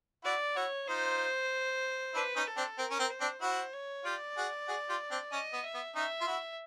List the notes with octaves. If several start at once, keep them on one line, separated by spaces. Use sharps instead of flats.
E4 F#4 D5
E4 F#4 C#5
D#4 F4 C5
D4 E4 B4
C#4 D#4
A4
C4 D4
C4 A#4
C#4
C4
C5
C4 D4
E4 F#4 C5
C#5
F4 G4 D5
F#4 G#4
F#4 G#4
F4 G4
C4 D4
C#4 D#5
B3
E5
B3
C#4 D#4 E5
F4
E4 F#4